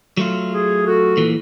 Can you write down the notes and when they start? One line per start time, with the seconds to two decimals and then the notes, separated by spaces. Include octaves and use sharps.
0.17 F#3 A3 F4
0.51 G#4
0.87 F#4 A4
1.17 A#2 E3